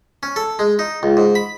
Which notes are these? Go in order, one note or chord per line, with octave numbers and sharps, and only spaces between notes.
C#4
A4
G#3
D#4
C#2
G#2
B5